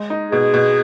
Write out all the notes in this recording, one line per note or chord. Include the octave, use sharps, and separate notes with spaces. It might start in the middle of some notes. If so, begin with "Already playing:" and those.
Already playing: G#3
D#4
B2 G#4
B2